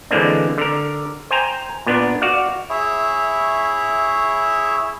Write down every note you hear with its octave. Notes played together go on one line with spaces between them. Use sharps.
D3 E3 G#3 A#3 C4 D4
D3 A#4
C5 G5 G#5 A#5
A#2 B3 D4
F#4 D5 F5
E4 G#4 C#5 E5